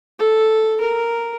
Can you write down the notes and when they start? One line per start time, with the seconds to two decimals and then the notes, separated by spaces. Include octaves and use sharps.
0.19 A4
0.80 A#4